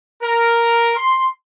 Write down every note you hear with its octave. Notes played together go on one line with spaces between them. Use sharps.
A#4
C6